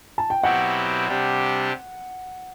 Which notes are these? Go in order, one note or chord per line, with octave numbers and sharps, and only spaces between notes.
A5
G5
B2 F#3 C4 E4 G4 F#5
C3 G3 D4 G4